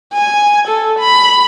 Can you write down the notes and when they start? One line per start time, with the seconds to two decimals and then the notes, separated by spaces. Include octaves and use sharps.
0.14 G#5
0.68 A4
0.99 B5